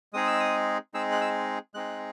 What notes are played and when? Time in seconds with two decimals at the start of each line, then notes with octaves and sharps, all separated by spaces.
0.13 G#3 C4 D#4 G#4 D#6
0.27 E6
0.40 D#6
0.94 G#3 C4 D#4 G#4 E6
1.11 F#6
1.21 E6
1.74 G#3 C4 D#4 G#4 F#6